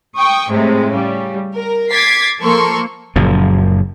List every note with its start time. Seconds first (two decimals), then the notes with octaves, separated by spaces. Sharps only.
0.17 G5 C#6 D#6
0.50 A2 C3 G#3
0.90 C#3 G3
1.55 A#4
1.90 D6 G#6 A6 B6 C7
2.39 F3 A#3 A4 A#4 C6 C#6
3.16 F#1 F#2 A#2 F3